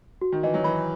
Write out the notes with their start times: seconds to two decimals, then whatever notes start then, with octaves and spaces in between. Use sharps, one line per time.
0.21 F#4
0.32 D#3
0.43 E3 D#5
0.54 F#3
0.64 E3 B5